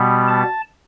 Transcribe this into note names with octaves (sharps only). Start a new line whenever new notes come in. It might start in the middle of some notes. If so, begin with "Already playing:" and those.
Already playing: B2 G3 B3
A5